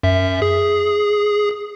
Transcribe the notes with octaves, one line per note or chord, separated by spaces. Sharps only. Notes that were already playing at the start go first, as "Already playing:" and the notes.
F#2 E5
G#4